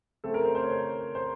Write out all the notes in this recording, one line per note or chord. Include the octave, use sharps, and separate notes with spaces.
C#3 A3 C4 A4
A#4
C5
C5
C#5
C5
C5